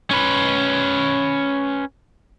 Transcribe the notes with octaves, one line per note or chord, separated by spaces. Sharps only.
C#4 B4